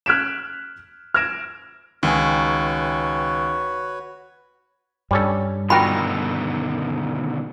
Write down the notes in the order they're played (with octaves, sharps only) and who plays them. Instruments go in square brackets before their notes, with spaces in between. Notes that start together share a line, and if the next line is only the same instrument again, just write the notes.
[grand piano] F6 F#6 G#6 B6 D7 E7
F6 G#6 A#6 D7 E7
[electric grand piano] C#2 G#5 [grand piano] D#3 [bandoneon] F#4 B4 C#5
[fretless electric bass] G2 [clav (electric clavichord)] G3 C#4 A4
[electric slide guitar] B2 D3 D#3 [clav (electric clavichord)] F4 F#4 A#4 [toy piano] G5 B5